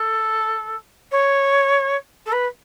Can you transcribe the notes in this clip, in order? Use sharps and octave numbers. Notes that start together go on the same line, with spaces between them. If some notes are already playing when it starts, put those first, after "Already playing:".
Already playing: A4
C#5
A4
B4